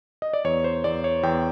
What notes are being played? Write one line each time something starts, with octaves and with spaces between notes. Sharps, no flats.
D#5
D5
E2 C#5
C5
E2 D5
C#5
E2 G5